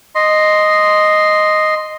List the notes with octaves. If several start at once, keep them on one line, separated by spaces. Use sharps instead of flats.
D#5 C6